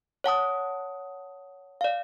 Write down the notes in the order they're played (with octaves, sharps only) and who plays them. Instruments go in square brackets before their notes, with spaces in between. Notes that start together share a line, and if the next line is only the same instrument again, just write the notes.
[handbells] C#5 F#5 A5 D#6
D5 F5